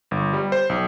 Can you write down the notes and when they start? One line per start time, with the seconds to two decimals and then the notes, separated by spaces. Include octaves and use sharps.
0.11 G1
0.33 G3
0.52 C5
0.69 B1